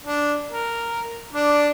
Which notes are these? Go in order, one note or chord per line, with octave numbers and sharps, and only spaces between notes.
D4
A#4
D4 D5